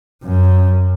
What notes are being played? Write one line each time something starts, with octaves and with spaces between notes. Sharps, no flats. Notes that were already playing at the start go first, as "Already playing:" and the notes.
F#2